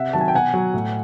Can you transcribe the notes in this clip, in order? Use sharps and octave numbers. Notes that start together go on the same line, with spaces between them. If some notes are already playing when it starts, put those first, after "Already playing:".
Already playing: C3 E5 F#5
D#3 F#3 A5
G#5
G5
B2 F#5 G#5
F#3
A2